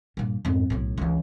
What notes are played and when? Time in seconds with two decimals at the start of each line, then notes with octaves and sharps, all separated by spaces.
0.17 G2 A#2
0.45 F2 G#2
0.70 B1 A2
0.98 C#2 E3